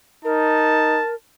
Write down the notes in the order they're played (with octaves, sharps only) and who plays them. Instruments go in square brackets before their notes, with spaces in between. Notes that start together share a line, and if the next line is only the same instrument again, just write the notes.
[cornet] D#4 [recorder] A#4 [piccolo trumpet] A5